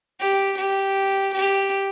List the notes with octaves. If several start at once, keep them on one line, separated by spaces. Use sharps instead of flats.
G4
G4
G4